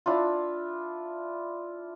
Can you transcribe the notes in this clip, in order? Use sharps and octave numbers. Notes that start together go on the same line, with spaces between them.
D4 E4 F4